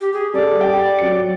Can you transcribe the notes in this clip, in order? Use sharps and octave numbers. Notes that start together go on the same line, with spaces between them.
G4
G#4
G3 A4 D5
G4 G5
F#3 C#7